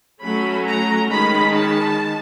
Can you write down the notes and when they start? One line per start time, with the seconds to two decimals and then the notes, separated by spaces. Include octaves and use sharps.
0.22 F#3 A3 C#4 B5
0.66 A#5
1.10 D#3 G#3 C#4 B5
1.54 A5